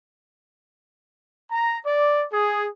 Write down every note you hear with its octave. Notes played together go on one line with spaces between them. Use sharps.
A#5
D5
G#4